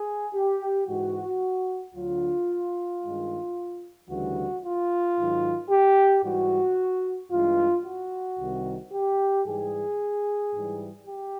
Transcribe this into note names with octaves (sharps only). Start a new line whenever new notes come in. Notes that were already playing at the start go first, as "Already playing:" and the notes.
Already playing: G#4
G4
G#2 E3 G#3 F#4
D2 D3 F#3 F4
G2 D#3 G#3
D2 C#3 E3 G3 F#4
F4
G#2 D#3 F#3
G4
G#2 E3 G3 F#4
G2 E3 G#3 F4
F#4
C2 C3 D#3 G3
G4
G#2 E3 G3 G#4
G#2 E3 G3
G4